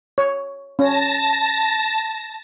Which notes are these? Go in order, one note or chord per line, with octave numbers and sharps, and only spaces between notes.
C#5
C#4 A5 A#6